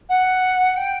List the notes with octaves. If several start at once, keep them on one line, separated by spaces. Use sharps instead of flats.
F#5
G5